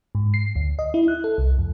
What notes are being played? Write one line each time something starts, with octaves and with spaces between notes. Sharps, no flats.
G#2
C7
D2
D#5
E4
F#6
A4
C2
F2